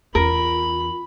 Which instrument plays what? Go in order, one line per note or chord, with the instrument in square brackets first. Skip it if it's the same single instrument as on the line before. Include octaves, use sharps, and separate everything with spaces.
[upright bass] E2 C#4 [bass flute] F4 [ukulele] A#4 [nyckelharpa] B5